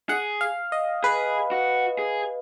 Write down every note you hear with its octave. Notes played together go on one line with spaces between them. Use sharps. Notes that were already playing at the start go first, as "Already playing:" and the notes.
G#4 F#5
F5
D#5
G#4 B4
F#4
G#4